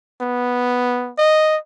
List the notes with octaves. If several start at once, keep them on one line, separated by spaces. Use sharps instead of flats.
B3
D#5